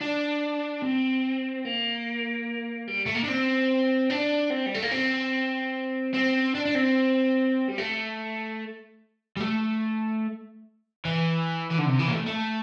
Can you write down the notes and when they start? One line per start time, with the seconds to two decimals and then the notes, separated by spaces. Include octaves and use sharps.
0.01 D4
0.83 C4
1.65 A#3
2.88 G3
3.06 A3
3.15 A#3
3.24 D4
3.28 C4
4.10 D4
4.50 C4
4.66 G3
4.74 A3
4.82 A#3
4.91 C4
6.14 C4
6.55 D4
6.66 D4
6.75 C4
7.68 G3
7.78 A3
9.37 G3
9.40 A3
11.05 E3
11.71 E3
11.79 D3
11.86 C3
12.00 E3
12.09 A#3
12.13 A3
12.27 A3